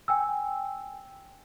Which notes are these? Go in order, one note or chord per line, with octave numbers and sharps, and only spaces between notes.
G5 G#5 E6